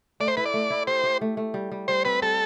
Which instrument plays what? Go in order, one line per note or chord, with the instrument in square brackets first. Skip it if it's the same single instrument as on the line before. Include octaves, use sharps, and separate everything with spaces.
[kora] A3 [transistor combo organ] D5
[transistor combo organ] C5
[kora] E4 [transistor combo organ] B4
[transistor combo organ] D5
[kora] A3
E4
[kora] G4 [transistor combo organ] C5
[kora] G4
A3
A3
G3
G3
[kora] G3 [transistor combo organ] C5
[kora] C4 [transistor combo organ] B4
[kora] G3 [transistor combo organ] A4